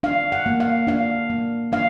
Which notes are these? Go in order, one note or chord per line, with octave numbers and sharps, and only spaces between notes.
D4 F5
F#5
A#3
F5
D4 F5
A#3
D4 F5